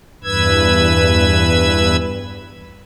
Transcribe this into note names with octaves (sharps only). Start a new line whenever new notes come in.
E2 G2 B4 E6 G#6